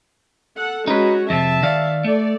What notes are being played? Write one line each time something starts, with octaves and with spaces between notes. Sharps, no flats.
A4 F#5
G#3 C#4 D#4 F#4 B4
F2 C3 E5 A5
D#3 D5 F5
A3 A4 D5